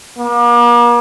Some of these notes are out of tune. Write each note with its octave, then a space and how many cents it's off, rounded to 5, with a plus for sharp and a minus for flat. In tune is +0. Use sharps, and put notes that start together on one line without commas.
A#3 +40